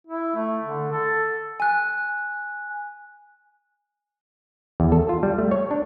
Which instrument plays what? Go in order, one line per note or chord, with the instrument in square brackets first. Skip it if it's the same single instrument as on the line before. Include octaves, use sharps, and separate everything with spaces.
[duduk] E4
A3
D3
A4
[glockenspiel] G#5 F#6
[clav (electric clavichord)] E2
A4
F4
G3
A3
C#5
D4